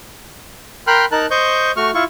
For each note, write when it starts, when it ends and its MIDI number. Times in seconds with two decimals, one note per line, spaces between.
0.87 1.05 70
0.87 1.05 79
0.87 1.05 83
0.87 1.05 84
0.87 1.05 89
0.87 1.05 90
1.12 1.26 63
1.12 1.26 70
1.12 1.26 81
1.12 1.26 90
1.31 1.71 72
1.31 1.71 75
1.31 1.71 85
1.31 1.71 91
1.77 1.91 57
1.77 1.91 66
1.77 1.91 85
1.77 1.91 89
1.94 2.04 64
1.94 2.04 65
1.94 2.04 85